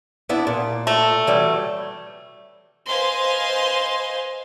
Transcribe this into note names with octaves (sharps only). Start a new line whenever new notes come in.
B3 D4 E4
A#2
A3
E3 F#3 G3
B4 C5 D#5 F5 G#5 C6